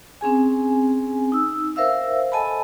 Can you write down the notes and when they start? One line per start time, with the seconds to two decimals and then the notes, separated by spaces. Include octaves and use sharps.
0.21 C4 C#4 G#4 G#5
1.32 D#4 E6
1.76 A#4 C5 E5 F5 E6
2.32 A4 D#5 G#5 A5 B5